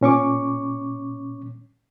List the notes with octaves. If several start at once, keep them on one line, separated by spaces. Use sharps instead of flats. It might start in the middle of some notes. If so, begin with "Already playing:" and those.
A#2 C#4 C#6 D6